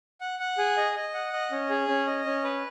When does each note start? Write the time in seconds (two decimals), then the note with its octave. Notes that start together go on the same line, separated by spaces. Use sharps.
0.21 F#5
0.40 F#5
0.58 G#4
0.77 D#5
0.95 D#5
1.14 F#5
1.33 D#5
1.51 C#4
1.70 G#4
1.88 C#4
2.07 D#5
2.25 C#4
2.44 B4